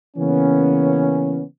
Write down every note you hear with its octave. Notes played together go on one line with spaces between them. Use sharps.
C#3 E3 A#3 B3 C#4